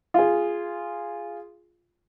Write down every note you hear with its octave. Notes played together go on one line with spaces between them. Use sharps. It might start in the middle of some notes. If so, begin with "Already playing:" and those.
F4 G#4